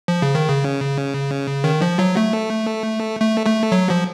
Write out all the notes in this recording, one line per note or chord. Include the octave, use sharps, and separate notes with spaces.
F3
C#3
D#3
C#3
D#3
F3
F#3
A3
A3
A3
F#3
F3